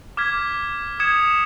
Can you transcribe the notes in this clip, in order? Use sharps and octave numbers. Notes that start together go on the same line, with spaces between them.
D6 F6 G#6 B6
D#6 G#6 C#7 E7